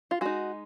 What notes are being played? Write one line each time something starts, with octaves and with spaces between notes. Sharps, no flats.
F4
G#3 D#4 F#4